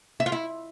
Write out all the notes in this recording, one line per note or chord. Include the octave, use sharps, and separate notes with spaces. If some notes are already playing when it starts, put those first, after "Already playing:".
E5
F4
E4